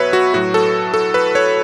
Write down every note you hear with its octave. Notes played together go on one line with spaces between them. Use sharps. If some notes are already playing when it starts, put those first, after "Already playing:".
Already playing: B2 F#3 B4 C#5 E5
F#4
A2 F#3 F#4
A4
A4
B4
C#5